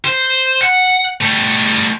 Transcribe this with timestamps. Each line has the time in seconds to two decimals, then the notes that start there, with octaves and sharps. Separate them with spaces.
0.05 C5
0.62 F#5
1.21 G3 A3